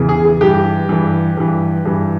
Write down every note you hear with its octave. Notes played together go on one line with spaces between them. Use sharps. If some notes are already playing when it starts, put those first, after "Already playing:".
Already playing: E2 C#3 E3
G#4
G#4
G2 E3 G4
G2 E3
G2 E3
G2 E3